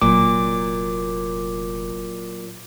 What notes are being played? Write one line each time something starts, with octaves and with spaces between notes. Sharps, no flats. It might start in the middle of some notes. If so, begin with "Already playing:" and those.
F1 A#2 F#3 D6